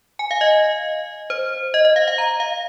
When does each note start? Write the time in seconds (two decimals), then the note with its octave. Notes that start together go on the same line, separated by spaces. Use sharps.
0.19 G#5
0.31 F5
0.41 D#5
1.30 C5
1.74 D#5
1.85 D#5
1.96 F5
2.07 F5
2.18 A#5
2.40 F5